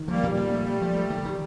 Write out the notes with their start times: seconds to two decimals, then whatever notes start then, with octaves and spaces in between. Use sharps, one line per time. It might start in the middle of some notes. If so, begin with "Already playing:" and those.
Already playing: D#3
0.08 F3 G3 A#3
0.23 A#2
0.31 G3
0.37 A#2
0.52 A3
0.67 A3
0.82 F3
0.96 A3
1.10 D#3
1.25 D#3